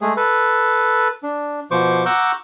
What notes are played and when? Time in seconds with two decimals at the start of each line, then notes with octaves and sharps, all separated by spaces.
0.01 G#3 A3 G#4
0.17 A4 B4
1.23 D4
1.71 B2 F3 C5 C#6 D6
2.06 F#5 A#5 C#6 D6 E6 G6